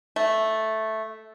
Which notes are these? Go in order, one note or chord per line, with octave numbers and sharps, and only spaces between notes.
A3